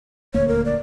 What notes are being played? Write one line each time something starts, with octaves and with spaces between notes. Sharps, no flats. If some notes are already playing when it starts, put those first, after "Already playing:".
D#1 D2 A#3 C#5
A#4
D5